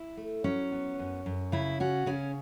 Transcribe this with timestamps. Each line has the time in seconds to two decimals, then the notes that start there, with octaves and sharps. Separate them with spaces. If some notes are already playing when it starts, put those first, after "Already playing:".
Already playing: E4
0.17 A3
0.44 F#3 C#4
0.72 B3
0.99 F#2
1.26 F#2
1.52 C#3 E4
1.80 C#4 F#4
2.06 C#3 C#4